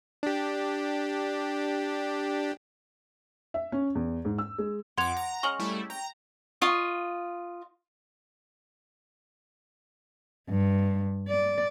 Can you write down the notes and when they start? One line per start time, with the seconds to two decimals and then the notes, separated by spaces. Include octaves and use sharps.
0.23 D4 G4
3.54 E5
3.72 C#4
3.95 E2
4.25 G#2
4.38 E6
4.58 G#3
4.98 F2 F#5 C6 D6 G#6 F7
5.16 A#5
5.43 G#3 C#4 C#6 F6 F#7 G7
5.59 G3 A3 E4
5.90 G5 A#5
6.61 F4 D#5 C#6
10.49 G2
11.29 D5